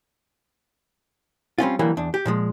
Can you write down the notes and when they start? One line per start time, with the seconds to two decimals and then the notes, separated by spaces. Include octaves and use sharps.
1.58 G3 C4 C#4 F4
1.79 D3 E3 F#3 G3 A#3
1.97 E2 D4
2.14 G4
2.25 A#2 F3 G#3